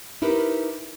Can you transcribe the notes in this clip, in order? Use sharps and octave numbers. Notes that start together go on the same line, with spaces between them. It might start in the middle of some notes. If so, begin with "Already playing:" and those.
D#4 E4 G4 A#4 B4